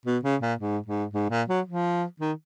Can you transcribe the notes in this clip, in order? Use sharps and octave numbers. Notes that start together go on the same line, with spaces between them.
B2
C#3
A#2
G#2
G#2
G#2
A#2
F#3
F3
D#3